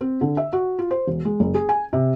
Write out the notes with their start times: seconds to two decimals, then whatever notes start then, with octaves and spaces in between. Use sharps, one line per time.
0.01 C4
0.21 D3
0.37 E5
0.53 F#4
0.79 F4
0.91 C5
1.07 E1
1.25 G#3
1.40 F#1
1.54 G#4
1.69 G#5
1.93 C3